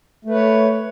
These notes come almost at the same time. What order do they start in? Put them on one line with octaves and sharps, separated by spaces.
A3 B4 C#5